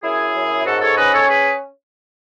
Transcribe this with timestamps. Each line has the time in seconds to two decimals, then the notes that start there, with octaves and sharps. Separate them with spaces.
0.02 F#2 E4 G#4
0.34 F#2
0.65 G#2 F#4 A4
0.81 A4 C#5
0.96 C#4 B4 D#5
1.13 A4 C#5
1.28 G#4 B4